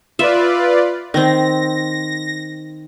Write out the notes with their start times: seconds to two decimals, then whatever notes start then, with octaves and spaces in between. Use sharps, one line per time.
0.19 F4 B4 D5 E5
1.14 D#3 C4 A#6